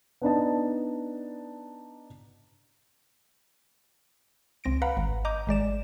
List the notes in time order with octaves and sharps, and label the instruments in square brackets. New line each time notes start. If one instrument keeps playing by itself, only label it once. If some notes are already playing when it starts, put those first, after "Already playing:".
[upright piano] B3 D4 D#4 A5
[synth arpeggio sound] C#2 C4 A#6 D7
B4 F5 F#5 A#5 B5
G#1
D#5 A#5 D6 G6
G#1 G#3 D5 E7